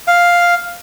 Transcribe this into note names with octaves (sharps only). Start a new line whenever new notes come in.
F5